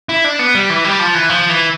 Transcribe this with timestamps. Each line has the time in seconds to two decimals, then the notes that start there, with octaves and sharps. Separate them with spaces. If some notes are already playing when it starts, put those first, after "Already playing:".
0.09 E4
0.24 D4
0.39 B3
0.55 G3
0.70 E3
0.84 G3
0.99 F3
1.15 E3
1.29 F3
1.49 E3